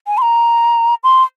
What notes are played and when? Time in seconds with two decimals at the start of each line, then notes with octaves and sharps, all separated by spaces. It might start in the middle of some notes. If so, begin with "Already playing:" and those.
0.07 G#5
0.18 C6
0.22 A#5
1.04 C6